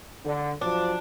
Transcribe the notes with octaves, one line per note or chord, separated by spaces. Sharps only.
D3
F3 F#3 D4